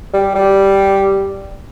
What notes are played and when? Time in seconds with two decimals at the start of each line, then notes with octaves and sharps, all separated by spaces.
0.14 G3
0.35 G3